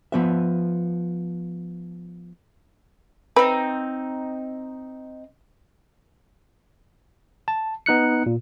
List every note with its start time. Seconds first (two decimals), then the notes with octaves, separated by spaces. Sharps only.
0.12 F3 B3 E5
3.36 C4 D#4 B4
7.48 A5
7.86 B3 D#4 F#6 C#7
8.26 A#2